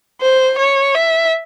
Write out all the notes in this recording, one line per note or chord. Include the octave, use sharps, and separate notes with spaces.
C5
C#5
E5